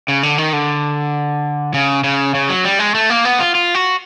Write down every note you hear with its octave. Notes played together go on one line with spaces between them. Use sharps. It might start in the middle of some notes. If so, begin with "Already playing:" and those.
C#3
D3
D#3
D3
C#3
C#3
C#3
F#3
G3
G#3
A3
A#3
B3
F4
F4
F#4